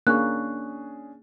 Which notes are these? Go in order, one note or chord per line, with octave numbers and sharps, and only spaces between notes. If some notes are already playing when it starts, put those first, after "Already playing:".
A#3 C#4 D4 G#4 C#6 F#6